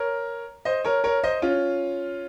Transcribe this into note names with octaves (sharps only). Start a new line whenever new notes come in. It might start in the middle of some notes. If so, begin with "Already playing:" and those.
Already playing: A#4 C#5
C5 D#5
A#4 C#5
A#4 C#5
C5 D#5
C#4 F4